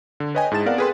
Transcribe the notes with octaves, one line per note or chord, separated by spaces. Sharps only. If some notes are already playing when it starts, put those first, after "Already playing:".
D3
B4 C#5 D#5 G5 G#5
G#2 E4 G#4 A5 A6 E7
B3 C4 A#4 D5 F5 F#5
G#4 A4 B4 G5 C6